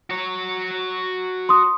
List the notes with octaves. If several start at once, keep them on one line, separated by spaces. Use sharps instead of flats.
F#4 C#5
C6 D#6